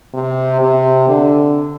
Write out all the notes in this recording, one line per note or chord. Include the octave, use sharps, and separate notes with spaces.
C3
C3
D3